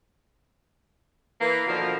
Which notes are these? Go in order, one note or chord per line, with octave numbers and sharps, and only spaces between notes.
E3 A#3 B4
B2 D3 F3 A#3